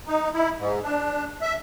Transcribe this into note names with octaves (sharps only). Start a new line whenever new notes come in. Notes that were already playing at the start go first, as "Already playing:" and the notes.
D#4
E4
G#2
D4
E5